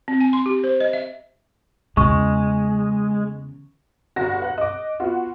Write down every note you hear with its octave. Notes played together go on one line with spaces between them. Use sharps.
C4
G#5
C6
G4
C5
D#5
E5
E2 C#3 G#3 C#6
G1 F#4 A#6
B4 F#5 F#6
D#5 D6
B3 F4 F#4